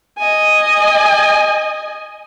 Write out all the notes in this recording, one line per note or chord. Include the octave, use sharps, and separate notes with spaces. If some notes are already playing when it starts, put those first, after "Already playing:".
D#5 G#5